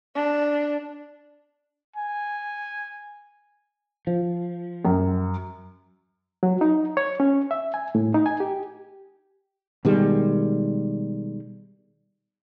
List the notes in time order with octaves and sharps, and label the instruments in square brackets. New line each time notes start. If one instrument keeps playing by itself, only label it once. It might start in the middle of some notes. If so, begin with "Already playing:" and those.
[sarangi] D4
[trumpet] G#5
[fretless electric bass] F3
[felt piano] F#2
[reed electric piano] F#3
D#4
C#5
C#4
E5
G#5
A2
D#4
G#5
G4
[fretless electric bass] B2 D#3 G3 G#3